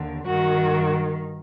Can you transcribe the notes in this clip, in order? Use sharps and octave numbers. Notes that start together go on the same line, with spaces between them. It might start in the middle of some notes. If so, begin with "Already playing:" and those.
Already playing: D#2 D3
G2 D#3 F#4